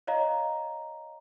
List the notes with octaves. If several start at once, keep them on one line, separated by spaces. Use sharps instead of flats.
C#5 D#5 F5 A#5